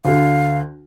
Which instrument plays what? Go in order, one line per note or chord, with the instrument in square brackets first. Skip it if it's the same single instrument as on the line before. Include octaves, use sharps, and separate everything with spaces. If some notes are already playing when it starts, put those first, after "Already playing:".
[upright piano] D2 D3 [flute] F5